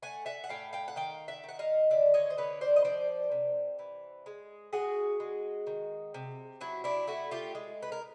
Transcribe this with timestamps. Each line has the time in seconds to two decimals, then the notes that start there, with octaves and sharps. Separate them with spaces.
0.02 A3 F#5 G#5
0.26 E5 F#5
0.44 F#5
0.49 A2 F5 G5
0.73 F5 G5
0.88 F#5
0.96 D#3 F5 G5
1.28 E5 F#5
1.44 D#3 F#5
1.59 D#5 F5
1.90 D3 D5 E5
2.14 C#5 D#5
2.30 C5
2.37 D3 B4 C#5
2.61 C5 D5
2.76 D#5
2.85 F3 C5 D5
3.31 C3
3.79 E3
4.26 G#3
4.73 G#3 F#4 G#4
5.20 G#3
5.67 D#3
6.14 C3
6.61 F#3 E4 F#4
6.84 D4 E4
7.07 A3 E4 F#4
7.31 F4 G4
7.55 G#3
7.82 B4
7.92 A#4